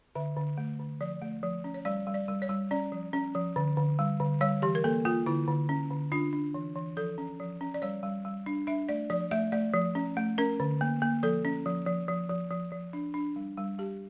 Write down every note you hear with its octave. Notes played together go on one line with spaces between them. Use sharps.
D3 E5
D3
A3
D3
F3 D5
A3
F3
C#4
C#5
G3 D5
G3
D5
G3
C#5
G3
C#4 D5
F3
C#4
F3
D3
D3
G3
D3
G3 C#5
E3 G4
A#4
A#3 A4
A#3 F4
D3 E4
D3
C#4
D3
D4 F4
D4
E3
E3
F3 A4
C#4
F3
C#4
D5
G3 C#5
G3
G3
D4
D4 E5
A3 D5
F3 D5
A3 E5
A3 D5
F3
C#4
A3
C#4 A#4
D3
A#3
A#3
F3 A4
C#4
F3
F3
F3
F3
F3
F3
D4
D4
G3
G3
G3 G4